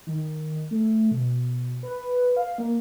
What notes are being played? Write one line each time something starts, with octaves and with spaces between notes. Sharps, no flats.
D#3
A3
B2
B4
F5
A#3